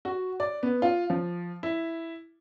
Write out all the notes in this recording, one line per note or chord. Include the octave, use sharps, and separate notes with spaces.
F#4
D5
B3
F4
F3
E4